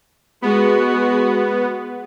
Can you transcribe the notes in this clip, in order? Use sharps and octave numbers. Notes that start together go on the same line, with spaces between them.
G#3 B3 F#4